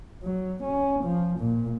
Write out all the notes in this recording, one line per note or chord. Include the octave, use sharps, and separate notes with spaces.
F#3
C#4
F3
A#2